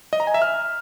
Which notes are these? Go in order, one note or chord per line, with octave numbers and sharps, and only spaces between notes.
D#5
A#5
G#5
E5
F6